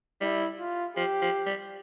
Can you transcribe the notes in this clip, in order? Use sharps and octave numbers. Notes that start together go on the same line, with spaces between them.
G3 E4
F4
F3 G4
F3
G3